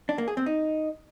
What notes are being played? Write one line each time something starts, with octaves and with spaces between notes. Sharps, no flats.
D4
A#3
G#4
C4
D#4